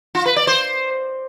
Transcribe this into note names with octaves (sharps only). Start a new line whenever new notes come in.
F4
B4
D5
C5